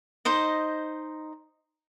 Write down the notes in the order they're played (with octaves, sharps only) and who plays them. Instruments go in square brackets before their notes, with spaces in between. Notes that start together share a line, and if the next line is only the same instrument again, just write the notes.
[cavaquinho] D#4 C5 D#5